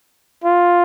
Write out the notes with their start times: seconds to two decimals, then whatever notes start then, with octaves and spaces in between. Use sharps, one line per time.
0.44 F4